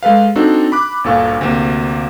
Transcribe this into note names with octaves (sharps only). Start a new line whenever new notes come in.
G#3 A4 B4 F5
C4 D4 D#4 F#4 A4
B5 D6 F#6
G1 D2 A#2 A4 F5 C#6
D2 C3 A#3